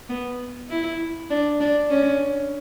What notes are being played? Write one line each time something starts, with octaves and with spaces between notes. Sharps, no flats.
B3
E4
D4
D4
C#4